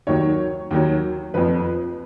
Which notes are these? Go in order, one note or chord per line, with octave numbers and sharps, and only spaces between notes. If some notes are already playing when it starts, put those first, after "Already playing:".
D#2 D#3 F#3 C#5
D#2 D#3 F#3
F2 F3 B4